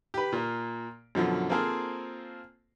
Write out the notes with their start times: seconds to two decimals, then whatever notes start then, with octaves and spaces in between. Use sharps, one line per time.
0.14 G4 B4
0.32 A#2 A#3
1.15 F#2 B2 D3 F3
1.50 A#3 C4 F4 G#4 A4 C5